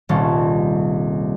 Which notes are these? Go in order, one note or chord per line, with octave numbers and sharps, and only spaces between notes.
D#1 C2 C#4 A5